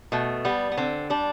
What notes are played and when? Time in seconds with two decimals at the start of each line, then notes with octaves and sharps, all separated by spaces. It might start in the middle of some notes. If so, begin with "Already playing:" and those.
0.12 B2 A3
0.45 G3 B3
0.72 B3
0.77 D3 C4
1.10 G3 D4